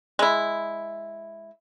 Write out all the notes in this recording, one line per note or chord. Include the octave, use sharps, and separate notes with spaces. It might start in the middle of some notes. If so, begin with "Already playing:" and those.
G#3 E4